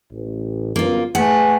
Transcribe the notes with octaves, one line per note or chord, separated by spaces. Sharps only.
A1
G1 F#2 A#3 B3 F4
A3 G#4 B4 F#5 G#5